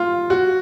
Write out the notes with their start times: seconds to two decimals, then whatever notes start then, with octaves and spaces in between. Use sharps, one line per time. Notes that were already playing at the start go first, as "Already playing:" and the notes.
Already playing: F4
0.30 F#4